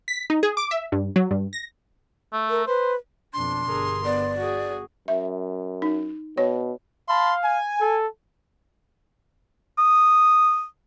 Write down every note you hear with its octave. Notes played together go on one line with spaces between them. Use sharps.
B6
D#4
G#4
D6
E5
G2
F#3
G2
A#6
A3
A#4
B4 C5
F2 B2 D4 C6
G1 G#4 A#4
B3 D5
F#4 G#4
F#2 E5
D#4
B2 C#5
F5 A5 B5 C6
G#5
A4
D#6